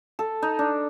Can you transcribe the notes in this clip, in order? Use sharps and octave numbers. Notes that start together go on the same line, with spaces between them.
A4
D#4
D4